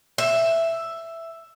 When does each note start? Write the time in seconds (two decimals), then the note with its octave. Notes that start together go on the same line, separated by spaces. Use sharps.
0.18 E5